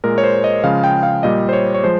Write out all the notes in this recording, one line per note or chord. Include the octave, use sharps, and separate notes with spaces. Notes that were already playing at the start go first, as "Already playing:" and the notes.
A#2 G#3 A#4
C#5
C5
D#5
C#3 F3 G#3 F5
G5
F5
A#2 G3 D#5
C5
C#5
C#5
F3 G#3 C5